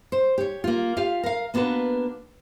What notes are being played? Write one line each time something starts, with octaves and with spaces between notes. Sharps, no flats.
C5
G4 C#5
A#3 F4
F4 G4 F5
A#4 F5
A#3 B3 D4 F#4 B4